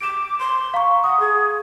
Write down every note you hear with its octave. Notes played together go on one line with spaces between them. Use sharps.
D6 D7 E7
C6
F5 A#5 C#6
F#5 D#6
G#4